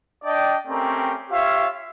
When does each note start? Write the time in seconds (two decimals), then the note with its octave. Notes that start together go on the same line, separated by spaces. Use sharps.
0.24 D4 D5 D#5 G5
0.67 A3 C4 C#4 G4 A#4
1.30 F4 G4 C#5 E5 F5